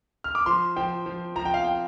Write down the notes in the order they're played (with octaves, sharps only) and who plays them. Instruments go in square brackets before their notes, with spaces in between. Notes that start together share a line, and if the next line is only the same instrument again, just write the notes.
[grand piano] F6
D6
F3 C6
F3 G5
F3
F3 A#5
G5
F5
G5